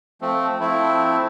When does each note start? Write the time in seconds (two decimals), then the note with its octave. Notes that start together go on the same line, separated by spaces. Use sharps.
0.21 F3 A3 C4
0.60 F3 A3 C4 E4